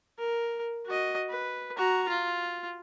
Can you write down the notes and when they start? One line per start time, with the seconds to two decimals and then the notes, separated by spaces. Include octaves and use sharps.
0.18 A#4
0.86 F#4 D#5
1.29 B4
1.77 F#4 A#5
2.08 F4